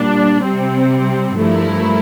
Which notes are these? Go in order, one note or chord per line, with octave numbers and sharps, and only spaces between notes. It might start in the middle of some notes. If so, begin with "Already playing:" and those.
Already playing: A#2 G3 D4
C3 G3 C4
G2 F3 A3 E4 A#4